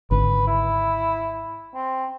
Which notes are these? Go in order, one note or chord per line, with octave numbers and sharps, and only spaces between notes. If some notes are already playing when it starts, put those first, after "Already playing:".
G#1 D3 B4
E4
C4